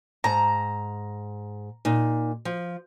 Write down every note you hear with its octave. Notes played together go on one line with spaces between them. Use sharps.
G#2 A5 A#5
A#2 D#4
F3